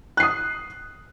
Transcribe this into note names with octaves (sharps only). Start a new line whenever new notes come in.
D#6 F#6 C7